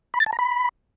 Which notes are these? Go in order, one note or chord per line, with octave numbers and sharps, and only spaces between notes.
B5
A6
A5
A#5
B5